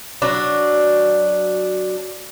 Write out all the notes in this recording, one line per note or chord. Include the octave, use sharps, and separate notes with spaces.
F#3 D4